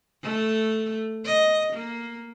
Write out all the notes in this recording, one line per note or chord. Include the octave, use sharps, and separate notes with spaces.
A3
D#5
A#3